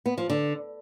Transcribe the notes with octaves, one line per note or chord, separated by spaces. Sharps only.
B3
F3
D3